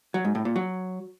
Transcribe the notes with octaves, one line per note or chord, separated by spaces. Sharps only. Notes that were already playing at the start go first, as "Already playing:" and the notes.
F#3
G#2
A2
A#2
F#3